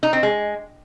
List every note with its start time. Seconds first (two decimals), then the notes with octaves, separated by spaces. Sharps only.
0.03 D#4
0.13 C4
0.23 G#3